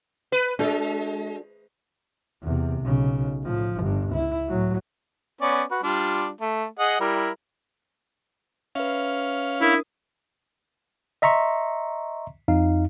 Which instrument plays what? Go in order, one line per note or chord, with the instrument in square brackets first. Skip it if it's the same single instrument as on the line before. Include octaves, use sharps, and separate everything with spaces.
[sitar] B4
[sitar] G#3 [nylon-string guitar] D4 F#4 A4
[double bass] E2 C3
B1 C#3
A2 F3
G1 G2
C#2 E4
A2 F#3
[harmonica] B3 C#4 D5
F#4 B4
G3 D4 F4
A3
G#4 D#5 F#5
G3 E4 A#4
[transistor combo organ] C#4 F5 [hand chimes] B4 E5
[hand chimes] D4 A#4 D#6 [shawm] E4
[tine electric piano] D#5 E5 A#5 C6 C#6
F2 D#4 F5